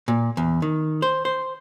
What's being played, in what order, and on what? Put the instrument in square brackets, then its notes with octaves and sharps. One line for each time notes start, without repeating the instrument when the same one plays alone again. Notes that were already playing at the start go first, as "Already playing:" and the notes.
[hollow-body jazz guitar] A#2
E2
D#3
C5
C5